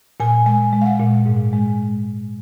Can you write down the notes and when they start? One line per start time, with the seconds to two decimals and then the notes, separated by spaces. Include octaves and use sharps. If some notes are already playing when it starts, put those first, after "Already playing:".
0.20 A#2 G#5
0.46 G#3 G#5
0.73 G#3
0.82 F5
0.86 F#5
1.00 A#2
1.26 G#2
1.53 G#3